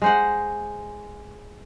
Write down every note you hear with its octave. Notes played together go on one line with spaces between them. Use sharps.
G#3 C5 F#5